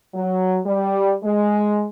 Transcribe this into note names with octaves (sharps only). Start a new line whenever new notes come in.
F#3
G3
G#3